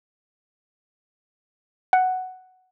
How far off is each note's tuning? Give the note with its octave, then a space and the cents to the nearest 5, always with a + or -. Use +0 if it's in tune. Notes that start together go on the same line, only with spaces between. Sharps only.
F#5 +5